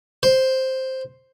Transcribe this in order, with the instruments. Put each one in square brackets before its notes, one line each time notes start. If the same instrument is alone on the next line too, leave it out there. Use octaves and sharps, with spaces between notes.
[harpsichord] C5